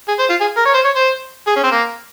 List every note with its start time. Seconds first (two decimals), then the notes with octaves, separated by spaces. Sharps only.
0.08 G#4
0.19 C5
0.30 F4
0.40 G#4
0.57 A#4
0.66 C#5
0.74 C5
0.85 C#5
0.96 C5
1.47 G#4
1.56 C#4
1.64 C4
1.72 A#3